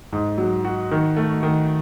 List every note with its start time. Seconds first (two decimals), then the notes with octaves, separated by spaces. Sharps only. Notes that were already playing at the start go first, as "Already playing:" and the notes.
0.13 G#2
0.38 F#3
0.65 F#4
0.91 D#3
1.16 A3
1.43 D#3